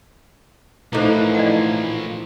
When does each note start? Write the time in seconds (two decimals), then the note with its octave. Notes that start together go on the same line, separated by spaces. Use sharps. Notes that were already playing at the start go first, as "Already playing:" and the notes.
0.93 A2 E3 F3 A#3 D#4 E4 A4 C5
1.35 D5 D#5 F#5